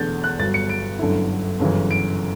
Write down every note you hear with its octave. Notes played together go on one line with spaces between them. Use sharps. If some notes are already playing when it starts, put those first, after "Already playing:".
Already playing: E1 E2 D3 A3 G6 A6
F#6
G1 G2 F#3 A6
C#7
D7
G1 F#2 D3 A3 E4
G1 F#2 C#3 E3
D7